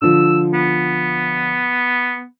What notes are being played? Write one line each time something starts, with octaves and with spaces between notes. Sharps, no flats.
D3 F3 E6
B3